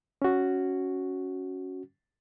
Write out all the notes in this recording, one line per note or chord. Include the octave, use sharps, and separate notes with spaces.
C#4 F#4